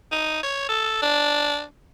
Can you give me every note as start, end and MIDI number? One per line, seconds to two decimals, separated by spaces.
0.12 0.41 63
0.43 0.67 73
0.69 0.98 69
1.02 1.63 62